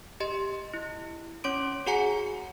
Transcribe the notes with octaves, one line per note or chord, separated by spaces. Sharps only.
G4 D#5 C6
E4
C#4 C#5 C6 D6 D7
F#4 G#4 F#5 G#5 A#5 C#7